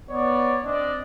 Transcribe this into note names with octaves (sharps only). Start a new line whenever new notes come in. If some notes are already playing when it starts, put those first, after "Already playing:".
B3 C#5 D5
C4 D4 D5 D#5